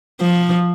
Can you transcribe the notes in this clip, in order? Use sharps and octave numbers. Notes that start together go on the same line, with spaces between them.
F3